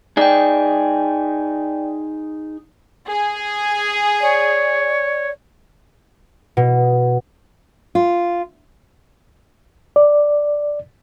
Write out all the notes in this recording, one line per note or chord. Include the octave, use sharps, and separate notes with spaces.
D#4 G#4 D5 G5
G#4
C#5 D5
B2
F4
D5